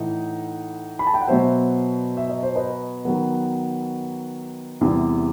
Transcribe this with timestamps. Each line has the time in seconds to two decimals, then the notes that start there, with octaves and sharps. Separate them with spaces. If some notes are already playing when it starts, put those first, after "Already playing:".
Already playing: A2 E3 A3 D#4 F#5
0.99 B5
1.07 A5
1.14 G5
1.21 F#5
1.28 B2 F#3 B3 C5 E5
2.17 E5
2.29 D#5
2.43 C5
2.55 B4 D#5
3.05 D#3 F#3 B3
4.81 E2 C3 E3 G3